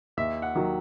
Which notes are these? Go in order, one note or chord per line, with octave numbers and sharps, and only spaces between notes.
D#2 E5
F#5
D#3 F#3